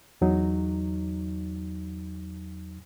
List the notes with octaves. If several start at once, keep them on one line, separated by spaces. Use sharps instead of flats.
E2 F#3 D#4